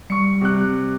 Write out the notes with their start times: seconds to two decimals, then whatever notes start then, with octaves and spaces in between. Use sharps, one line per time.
0.10 G3 C#6 C#7
0.41 C3 F#6